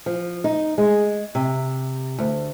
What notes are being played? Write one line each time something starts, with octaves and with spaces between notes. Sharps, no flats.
F3
D#4
G#3
C3
D2